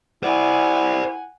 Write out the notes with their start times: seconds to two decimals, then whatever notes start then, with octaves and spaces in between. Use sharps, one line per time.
0.23 E4 C5 D5 F#5 G#5